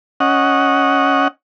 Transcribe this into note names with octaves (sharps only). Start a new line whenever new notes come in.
C#4 D#5 F#5